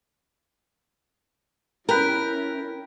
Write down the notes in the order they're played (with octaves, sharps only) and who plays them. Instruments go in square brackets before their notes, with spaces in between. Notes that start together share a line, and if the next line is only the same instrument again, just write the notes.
[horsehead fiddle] C#4 E4 [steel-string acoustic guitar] A#4 [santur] G5 B5 [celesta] A#5 F#6